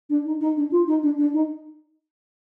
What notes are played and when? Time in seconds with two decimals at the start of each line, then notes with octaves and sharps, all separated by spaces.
0.09 D4
0.25 D#4
0.40 D#4
0.56 D4
0.71 F4
0.87 D#4
1.02 D4
1.18 D4
1.33 D#4